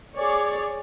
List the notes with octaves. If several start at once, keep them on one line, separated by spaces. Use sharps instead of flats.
G#4 C#5 D5